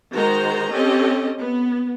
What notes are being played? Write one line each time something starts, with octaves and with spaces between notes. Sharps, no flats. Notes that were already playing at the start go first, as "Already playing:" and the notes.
D#3 G#3 F#4 C5 A#5
C4 C#4 G4 A4 D#5
B3